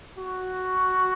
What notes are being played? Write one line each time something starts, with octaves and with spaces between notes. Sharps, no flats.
F#4